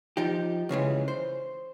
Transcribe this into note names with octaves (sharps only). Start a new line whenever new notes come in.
F3 D#4 G4
C#2 C#3 E3 G#3
C5